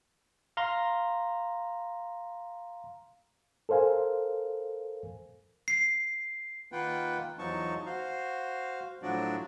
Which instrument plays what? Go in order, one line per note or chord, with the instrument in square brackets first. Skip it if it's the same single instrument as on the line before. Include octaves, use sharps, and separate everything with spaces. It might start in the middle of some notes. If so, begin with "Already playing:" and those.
[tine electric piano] F5 A#5 C6
[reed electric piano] A4 A#4 C5 F5 G#5
[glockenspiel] C7
[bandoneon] D#3 A#3 F4 B4 F#5 G5
E2 F3 F#3 D#4 A5 C#6
F#4 C5 F5
A2 F3 F#3 D4 F#4 D5